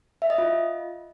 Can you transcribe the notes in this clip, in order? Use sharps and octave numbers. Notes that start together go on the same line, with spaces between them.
E5
D#5
F4